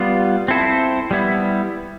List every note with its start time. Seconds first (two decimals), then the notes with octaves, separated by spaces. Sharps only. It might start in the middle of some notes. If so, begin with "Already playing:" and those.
Already playing: G3 B3 F4
0.48 C4 E4 A4 C5
1.11 G3 B3 E4